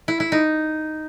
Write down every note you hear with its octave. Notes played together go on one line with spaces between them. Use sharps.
E4
E4
D#4